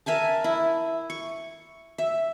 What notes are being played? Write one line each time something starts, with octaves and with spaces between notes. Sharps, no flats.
A#4 E5 G#5 A5
E4
C#6
E5